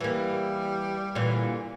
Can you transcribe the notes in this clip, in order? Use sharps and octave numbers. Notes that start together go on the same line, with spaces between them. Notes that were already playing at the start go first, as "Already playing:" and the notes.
E3 G3 A#3
A#2 D3 E3